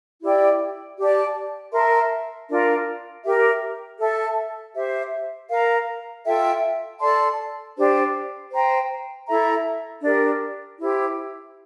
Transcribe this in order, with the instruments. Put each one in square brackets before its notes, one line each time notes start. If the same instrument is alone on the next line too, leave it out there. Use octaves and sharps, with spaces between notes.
[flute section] E4 G4 D5 G5
G4 D5 A5
A#4 E5 A5 C6
D4 F4 A#4
G4 A#4 E5
A4 E5 A5
G4 C5 E5
A#4 F5 A#5
F4 A4 E5 G5
A4 D5 A5 C6
D4 G4 C5
C5 G5 A#5
E4 A4 E5 A#5
D4 G4 A#4
E4 G4 C5